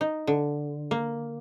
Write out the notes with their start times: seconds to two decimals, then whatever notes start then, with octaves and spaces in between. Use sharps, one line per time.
0.01 D#4
0.27 D3
0.91 A#3